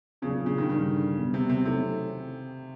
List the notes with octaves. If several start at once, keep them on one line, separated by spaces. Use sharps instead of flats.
A#2 C#3 F#3 B3 D4
C#3
C#3
D#3
G2 D3 D#3 G3
B2 G3 B3
C3
C3
C3 D#3 F#3 A3 C#4 E4